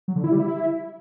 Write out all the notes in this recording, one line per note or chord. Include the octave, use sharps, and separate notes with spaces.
F#3
D3
E4
G3
E4